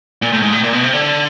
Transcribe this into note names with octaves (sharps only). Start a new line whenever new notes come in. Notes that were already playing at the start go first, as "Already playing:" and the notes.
A#2
A2
G#2
A2
A#2
B2
C3
D3